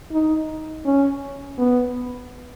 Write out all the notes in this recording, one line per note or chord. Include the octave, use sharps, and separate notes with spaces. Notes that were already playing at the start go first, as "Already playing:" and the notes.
D#4
C#4
B3